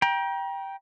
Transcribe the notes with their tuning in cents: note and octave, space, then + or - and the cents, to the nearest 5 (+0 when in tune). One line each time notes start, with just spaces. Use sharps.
G5 +0 A#5 +35